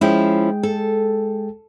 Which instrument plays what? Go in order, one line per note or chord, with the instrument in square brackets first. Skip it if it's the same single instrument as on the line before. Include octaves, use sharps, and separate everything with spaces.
[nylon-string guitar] F3 C#4 E4 [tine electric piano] G#3 G#4 G5
[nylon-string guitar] A4